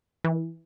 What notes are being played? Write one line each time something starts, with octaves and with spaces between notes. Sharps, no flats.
E3